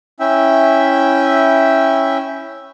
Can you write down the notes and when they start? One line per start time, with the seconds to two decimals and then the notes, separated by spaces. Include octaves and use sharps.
0.20 C#4 E4 E5 G5